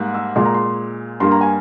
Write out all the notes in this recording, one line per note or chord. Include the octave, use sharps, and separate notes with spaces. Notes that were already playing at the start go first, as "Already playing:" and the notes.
Already playing: G#2 G3 A#3
E6
A#2 G#3 C6
A#5
C6
G2 G3 A#3 C6
A#5
G#5